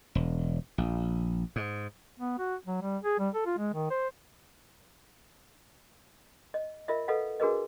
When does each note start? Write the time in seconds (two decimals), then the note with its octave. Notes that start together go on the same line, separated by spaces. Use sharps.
0.15 E1
0.78 A#1
1.56 G#2
2.20 B3
2.39 F#4
2.66 F#3
2.82 G3
3.04 G#4
3.19 G3
3.35 A4
3.46 F4
3.58 G#3
3.74 D#3
3.90 C5
6.54 D#5
6.88 F4 A#4 D#5 E5
7.08 A4 B4 D#5 F5 F#5
7.40 D4 F#4 G#4 A#4 B4 D#5